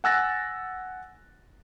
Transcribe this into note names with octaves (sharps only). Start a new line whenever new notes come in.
F#5 G#5 E6 F#6 A6 A#6